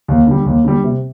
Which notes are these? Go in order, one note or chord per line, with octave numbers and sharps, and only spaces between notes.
D#2
D3 G3
D#2
D3 G3
C3